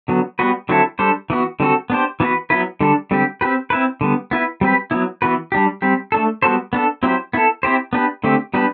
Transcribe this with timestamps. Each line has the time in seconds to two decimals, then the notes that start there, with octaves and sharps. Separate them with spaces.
0.08 D3 F#3 B3
0.39 G3 B3 F#4 B4
0.69 D3 F#3 C4 E4 A4
0.99 G3 D4 A4 C5
1.30 E3 B3 F#4
1.60 D3 G3 C4 F#4 A4
1.90 B3 D4 G4 C5
2.20 E3 B3 F#4 B4
2.50 F#3 B3 E4 B4
2.81 D3 G3 D4 A4
3.11 D3 G3 C4 G4
3.41 C4 G4 B4
3.70 C4 E4 B4
4.01 D3 G3 B3
4.31 B3 E4 B4
4.61 G3 C4 G4 B4
4.91 F#3 B3 E4
5.22 E3 B3 F#4 B4
5.52 G3 D4 G4
5.82 G3 C4 G4
6.12 A3 D4 A4
6.42 G3 B3 F#4 A4 C5
6.73 B3 D4 A4
7.03 F#3 C4 E4 G4 C5
7.33 B3 E4 A4
7.63 C4 E4 G4 C5
7.93 B3 D4 G4 B4
8.24 D3 A3 C4 G4
8.54 G3 B3 D4 G4 B4